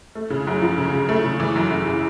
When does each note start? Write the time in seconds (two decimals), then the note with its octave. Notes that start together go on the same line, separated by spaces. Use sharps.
0.15 A3
0.30 C#3
0.47 F#2
0.62 F3
0.78 C#3
0.93 C#3
1.09 A3
1.24 C#3
1.40 E3
1.56 F#2
1.71 F#2
1.86 C#3